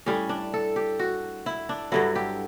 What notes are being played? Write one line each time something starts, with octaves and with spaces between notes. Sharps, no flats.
A2 G3 C#4
D4
A4
G4
F#4
E4
D4
G2 D3 F#3 E4
G4